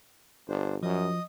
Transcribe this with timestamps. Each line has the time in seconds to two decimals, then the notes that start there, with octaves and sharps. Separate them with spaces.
0.48 G1 D4 C5
0.83 F#2 F3 D#5 D#6